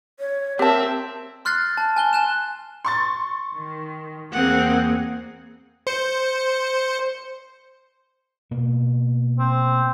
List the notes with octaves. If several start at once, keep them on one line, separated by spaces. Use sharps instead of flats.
C#5
C4 G4 A#4 E5 A5
C6 F6 F#6 A6 C7
A5
G#5 F#6 G7
G#5 F#6 E7
C6 C#6 A6
D#3
E2 A#3 C4 G#4 F#5
C5 C#7
B2 A#3
C4